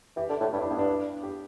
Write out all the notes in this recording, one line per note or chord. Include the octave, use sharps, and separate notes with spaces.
E3 G4
D3
A2
G4
G2 E4
D4
G2 B3
D4
G4